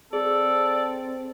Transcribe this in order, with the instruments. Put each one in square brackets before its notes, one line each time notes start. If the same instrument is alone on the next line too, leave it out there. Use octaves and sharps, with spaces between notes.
[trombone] C4 [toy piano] G#4 [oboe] A4 [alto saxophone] D5